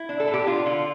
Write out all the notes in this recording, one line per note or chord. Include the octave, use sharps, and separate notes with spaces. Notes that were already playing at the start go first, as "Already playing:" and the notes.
Already playing: E4
D4
A4
A2
G4
D4 F4
D3 F4